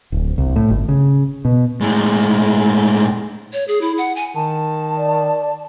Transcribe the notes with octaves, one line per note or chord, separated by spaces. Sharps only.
D1
C2
A2
G1
C#3
B2
A2 G#3
C#5
G#4
E4
F#5
G#5
D#3 A5
D5